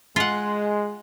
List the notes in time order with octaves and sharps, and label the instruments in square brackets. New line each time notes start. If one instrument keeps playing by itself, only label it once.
[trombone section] G#3 [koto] F4 F#5